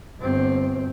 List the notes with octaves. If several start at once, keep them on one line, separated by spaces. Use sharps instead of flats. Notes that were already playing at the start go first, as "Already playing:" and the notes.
G1 C4